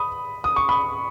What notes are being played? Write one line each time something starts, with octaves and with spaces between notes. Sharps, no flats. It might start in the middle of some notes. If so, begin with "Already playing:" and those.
Already playing: B5 D#6
D#6
C#6
B5 D#6